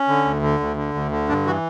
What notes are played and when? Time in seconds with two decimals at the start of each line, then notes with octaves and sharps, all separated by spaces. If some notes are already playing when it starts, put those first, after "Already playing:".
Already playing: C#4
0.08 D3
0.25 D2
0.42 D3
0.60 D2
0.77 D3
0.94 D2
1.11 D3
1.28 G2 D4
1.46 E3 F#4